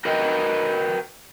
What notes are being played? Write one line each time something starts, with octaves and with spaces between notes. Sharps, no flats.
F#4 A#4 B4 D#5 G5